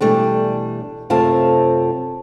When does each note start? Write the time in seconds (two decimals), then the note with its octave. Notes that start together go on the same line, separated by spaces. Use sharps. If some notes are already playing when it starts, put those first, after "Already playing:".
0.01 B2 E3 G3 A3 D4
1.10 F#2 C3 A3 C4 F4 A5